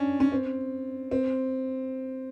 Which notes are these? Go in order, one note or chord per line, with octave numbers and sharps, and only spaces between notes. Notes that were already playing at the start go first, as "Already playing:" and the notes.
Already playing: C#4 D4
C#4
C4
C4